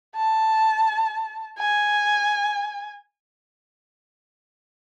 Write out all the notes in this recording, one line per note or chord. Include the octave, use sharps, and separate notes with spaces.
A5
G#5